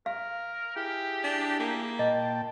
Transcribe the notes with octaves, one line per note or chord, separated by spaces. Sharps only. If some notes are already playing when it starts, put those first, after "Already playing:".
A#4 F5
E4 G4 G#4
D4
A#3
A#2 D#5 G5 A5